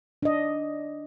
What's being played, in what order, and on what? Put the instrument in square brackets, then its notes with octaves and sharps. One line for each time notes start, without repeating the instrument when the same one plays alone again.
[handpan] D4 D#5